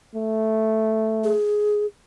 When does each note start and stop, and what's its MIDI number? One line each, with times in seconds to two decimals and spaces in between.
0.15 1.34 57
1.24 1.86 68